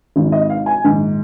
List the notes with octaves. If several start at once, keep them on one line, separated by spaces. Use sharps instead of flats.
G#1 G#2 D#3
D#5
F5
G#5
A#1 G#2 D#3